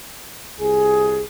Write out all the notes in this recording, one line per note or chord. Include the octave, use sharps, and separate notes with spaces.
C2 G#4